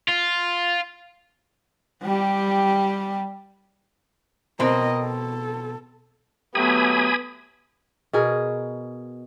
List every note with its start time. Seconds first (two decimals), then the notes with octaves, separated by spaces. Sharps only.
0.09 F4
2.03 G3 G4
4.60 B2 C4 A#4 D#5
5.00 A4
6.55 F#3 A3 B3 G4 G#5 B5 D#6
8.13 B2 G#4 A#4